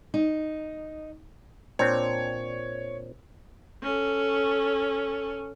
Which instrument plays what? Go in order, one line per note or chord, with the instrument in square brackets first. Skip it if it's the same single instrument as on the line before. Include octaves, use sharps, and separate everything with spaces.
[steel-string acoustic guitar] D#4
[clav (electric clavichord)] A#2 C4 D4 [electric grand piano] C#5
[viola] C#4 A4